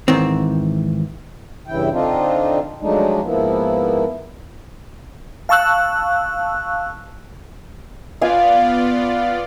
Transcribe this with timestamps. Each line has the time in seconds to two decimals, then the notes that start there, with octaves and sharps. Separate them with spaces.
0.08 G#2 D#3 E3 C4
1.68 G2 C#3 E3 E4 G5
1.92 D3 C4 D4 D#4 F4
2.81 F3 F#3 G#3 A3 D4 D#4
3.23 G#2 F3 A#3 B3 E4
5.49 F5 A5 C#6 E6 F#6
8.21 B3 F4 D5 F5 G5 G#5